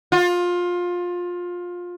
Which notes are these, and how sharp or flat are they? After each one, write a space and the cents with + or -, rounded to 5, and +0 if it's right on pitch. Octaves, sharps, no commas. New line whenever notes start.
F4 +20